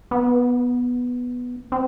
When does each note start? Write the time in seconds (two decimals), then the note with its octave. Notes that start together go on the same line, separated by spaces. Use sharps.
0.11 B3
1.72 C4